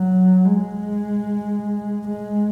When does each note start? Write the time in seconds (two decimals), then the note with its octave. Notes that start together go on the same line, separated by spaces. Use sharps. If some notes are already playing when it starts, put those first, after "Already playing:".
Already playing: F#3
0.45 G#3
2.08 G#3